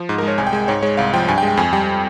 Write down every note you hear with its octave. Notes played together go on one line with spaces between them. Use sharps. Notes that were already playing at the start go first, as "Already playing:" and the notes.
Already playing: F3
G#2
A#4
G#3 C#5
C2 G#5
G5
G#3 G#5
G#2 C#5
G#3 C#5
C2 F5
F3 G5
G2 G#5
G5
G#3
G5
F2 G#5
G3 G5